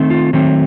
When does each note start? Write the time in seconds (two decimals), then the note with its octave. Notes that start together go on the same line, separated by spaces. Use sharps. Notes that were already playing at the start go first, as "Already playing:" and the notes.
Already playing: D#3 A3 C4
0.10 F4
0.33 D#3 F#3 A3 C4